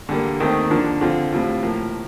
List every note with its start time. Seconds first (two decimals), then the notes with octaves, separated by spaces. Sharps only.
0.09 D3 G3 A#3
0.40 D#2 D#3 A3 C4 D#4
0.71 D3 F3 A#3 D4
1.01 D3 F3 C4 F4
1.33 A2 G3 C4 F4
1.63 A2 F3 A#3